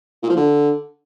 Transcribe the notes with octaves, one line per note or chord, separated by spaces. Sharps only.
A#2
F3
D3